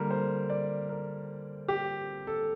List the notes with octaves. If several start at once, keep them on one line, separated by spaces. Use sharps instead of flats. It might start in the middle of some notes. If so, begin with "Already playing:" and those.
Already playing: D3 G3 A#3 A#4
C5
D5
A#4
G4
A4